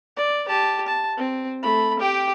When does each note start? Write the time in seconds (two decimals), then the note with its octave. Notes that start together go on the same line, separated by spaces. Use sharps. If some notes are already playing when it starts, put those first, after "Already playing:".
0.17 D5
0.48 G4 A5
0.87 A5
1.17 C4
1.63 A3 B5
1.99 G4 G5